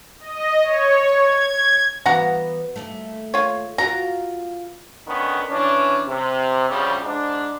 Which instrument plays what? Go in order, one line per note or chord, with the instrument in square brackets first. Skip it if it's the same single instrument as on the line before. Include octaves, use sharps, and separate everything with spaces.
[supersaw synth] D#5
C#5
G#6
[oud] E3 B3 F5 [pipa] F#4 F#5 A#5
[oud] D#2 G#2 A3
[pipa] F4 C#5
[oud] F4 F#4 A#4 [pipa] A#5
[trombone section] D3 D#3 B3 C#4
E3 C#4 D4
C3
D2 C#3 F3 G3
G#2 D4